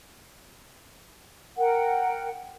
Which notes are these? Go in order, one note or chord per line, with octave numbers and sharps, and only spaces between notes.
A#4 F#5 G5